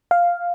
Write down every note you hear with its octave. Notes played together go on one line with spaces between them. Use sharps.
F5